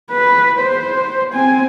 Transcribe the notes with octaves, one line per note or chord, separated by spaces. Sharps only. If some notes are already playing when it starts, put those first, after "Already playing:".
B4
C5
C4 G#5